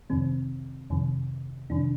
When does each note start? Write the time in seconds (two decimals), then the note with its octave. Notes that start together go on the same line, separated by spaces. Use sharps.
0.10 F2 C3 D#3 C4
0.90 F2 C3 D#3
1.70 F2 C3 D#3 D4